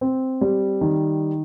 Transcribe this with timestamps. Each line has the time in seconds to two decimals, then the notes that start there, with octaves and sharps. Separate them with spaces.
0.01 C4
0.41 G3
0.81 D#3